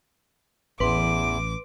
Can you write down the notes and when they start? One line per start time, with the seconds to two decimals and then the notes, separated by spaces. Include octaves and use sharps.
0.80 A1 E2 B4 C6 D6